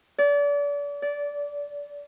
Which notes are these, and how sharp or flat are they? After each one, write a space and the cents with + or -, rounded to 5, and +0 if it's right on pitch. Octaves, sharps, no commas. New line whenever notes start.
D5 -35
D5 -20